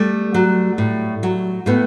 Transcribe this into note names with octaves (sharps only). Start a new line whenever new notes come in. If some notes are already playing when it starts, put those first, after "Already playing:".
Already playing: G3 A3
F#3
A2
F#3
A2 A3 B3